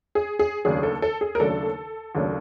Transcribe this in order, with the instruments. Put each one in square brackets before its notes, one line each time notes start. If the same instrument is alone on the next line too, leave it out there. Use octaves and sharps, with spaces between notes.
[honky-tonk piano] G#4
G#4
D#2 C#3 F#3 A3 D4 G#4
A4
A4
G#4
A#4
D#2 C#3 F#3 A3 D4 A4
D#2 C#3 F#3 A3 D4